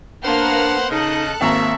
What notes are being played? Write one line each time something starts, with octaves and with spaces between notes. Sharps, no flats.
A#3 B3 D4 C5 F#5 F6
C#3 D#4 A4 D#5 F#6
G#1 A#3 C5 C#5 E5 A#5